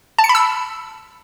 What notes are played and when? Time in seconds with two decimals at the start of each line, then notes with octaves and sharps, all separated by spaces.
0.19 A5
0.24 C#7
0.29 B5
0.35 E6